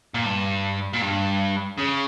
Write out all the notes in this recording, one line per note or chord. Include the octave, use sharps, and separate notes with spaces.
A#2
G2
A#2
G2
C#3